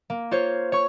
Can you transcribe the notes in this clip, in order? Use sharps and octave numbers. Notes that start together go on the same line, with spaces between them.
A#3
F4 C5 C#5
C#5 C#6